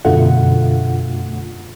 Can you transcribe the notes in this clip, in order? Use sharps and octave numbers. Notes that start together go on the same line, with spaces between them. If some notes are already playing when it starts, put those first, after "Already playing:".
F#2 B2 D3 A3 F4 F#5